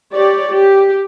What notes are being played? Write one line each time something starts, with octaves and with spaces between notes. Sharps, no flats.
G4 C#5 D5
G4